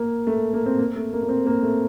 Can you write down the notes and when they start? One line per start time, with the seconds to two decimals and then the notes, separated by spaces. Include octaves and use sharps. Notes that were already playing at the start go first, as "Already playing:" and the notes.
Already playing: A#3
0.27 A3
0.53 A#3
0.66 C4
0.78 A#3
0.96 A3
1.13 A#3
1.23 A#3
1.29 C4
1.46 A#3
1.63 A3